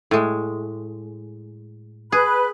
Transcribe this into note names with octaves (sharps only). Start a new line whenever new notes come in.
A2 G#3
G#4 B4 B5 F#6